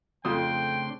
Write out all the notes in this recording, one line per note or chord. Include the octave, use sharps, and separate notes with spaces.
F2 C#3 A3 C4 D4 G5 C6 D#6